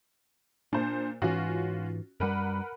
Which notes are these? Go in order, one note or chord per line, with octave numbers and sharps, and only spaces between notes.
A#2 D4 C5
G#2 E3 C#4 F4 F#4
F#2 G3 A#4 B4 F#5